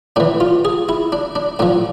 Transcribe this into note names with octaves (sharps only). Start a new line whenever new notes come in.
A2 E3 D4
F4
G#4
E4
D4
D4
A2 F3 D4